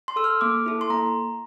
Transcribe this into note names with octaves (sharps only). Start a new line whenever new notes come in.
C6
A4 E6
F6
A#3 D6
E4 A4
C6
A#3 A#5